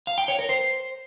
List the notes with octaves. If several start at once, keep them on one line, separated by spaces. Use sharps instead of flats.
F5
G5
C#5
A#4
C5